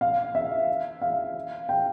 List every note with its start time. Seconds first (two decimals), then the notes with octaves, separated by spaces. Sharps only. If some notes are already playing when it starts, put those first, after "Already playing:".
0.01 F5
0.35 E5
1.01 F5
1.69 G5